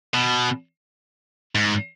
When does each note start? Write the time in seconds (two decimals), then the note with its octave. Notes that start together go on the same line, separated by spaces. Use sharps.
0.14 B2
1.55 G#2